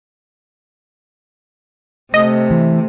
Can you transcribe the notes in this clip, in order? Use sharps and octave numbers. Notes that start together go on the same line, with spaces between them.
C3 A3 D#5
E3